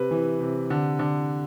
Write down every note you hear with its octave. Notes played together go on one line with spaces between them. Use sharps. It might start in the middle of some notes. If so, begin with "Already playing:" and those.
Already playing: C3 B4
E3
C3
D3
D3